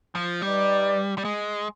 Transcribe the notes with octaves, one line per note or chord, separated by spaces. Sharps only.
F3
G3 D#4 B4 D5
G3
G#3